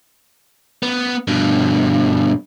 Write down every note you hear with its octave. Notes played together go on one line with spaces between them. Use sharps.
B3
G2 B2